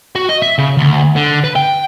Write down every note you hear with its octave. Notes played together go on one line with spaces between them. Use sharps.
F#4
D#5
E5
C#3
D2
D3
B4
G5